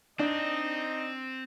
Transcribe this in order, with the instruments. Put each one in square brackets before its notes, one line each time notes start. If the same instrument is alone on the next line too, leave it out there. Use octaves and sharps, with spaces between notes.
[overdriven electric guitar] C4 [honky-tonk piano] D4 [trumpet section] D#4 D#5